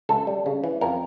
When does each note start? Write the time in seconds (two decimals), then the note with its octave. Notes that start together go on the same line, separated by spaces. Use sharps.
0.09 C#2 A4
0.27 G3
0.46 C#3
0.64 E3
0.81 F2 A#4